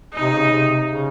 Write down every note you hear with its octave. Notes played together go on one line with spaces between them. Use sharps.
D#4
C3
C#3
C3
C#3